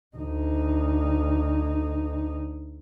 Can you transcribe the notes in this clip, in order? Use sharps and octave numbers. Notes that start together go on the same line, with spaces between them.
D2 D#4